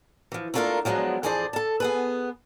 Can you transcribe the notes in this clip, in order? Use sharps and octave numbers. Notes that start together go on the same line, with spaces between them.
E3 F3
A3 A#3 D4 F4 A4 A#4
F3 F#3 G#3 B3 D4
F2 E3 G#4 C5 D5 A5
A4 A5
B3 G#4 B4